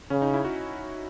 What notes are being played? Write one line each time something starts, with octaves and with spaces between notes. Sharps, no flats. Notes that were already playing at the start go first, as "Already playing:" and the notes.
C#3 C#4
D#4
E4
F#4